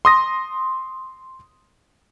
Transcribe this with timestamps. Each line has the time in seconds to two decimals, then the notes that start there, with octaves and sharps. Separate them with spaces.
0.05 C6 D#6 A#6